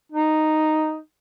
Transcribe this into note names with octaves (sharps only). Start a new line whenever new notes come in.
D#4